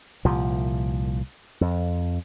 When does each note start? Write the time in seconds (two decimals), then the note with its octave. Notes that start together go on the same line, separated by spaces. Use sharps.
0.25 C2 A#2 F3
1.61 F2